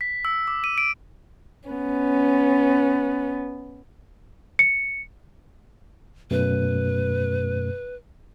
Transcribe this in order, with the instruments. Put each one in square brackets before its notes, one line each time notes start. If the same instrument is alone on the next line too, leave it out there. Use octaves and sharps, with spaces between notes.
[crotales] B6
E6
D6
D#7
D7
[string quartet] B3 C#4
[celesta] C#7
[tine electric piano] F#2 B2 A3 [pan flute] B4